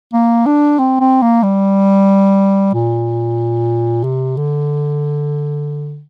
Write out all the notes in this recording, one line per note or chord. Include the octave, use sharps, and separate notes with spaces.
A#3
D4
C4
C4
A#3
G3
A#2
C3
D3